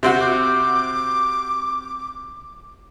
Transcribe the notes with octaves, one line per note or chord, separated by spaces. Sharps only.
C3 C4 F#4
D6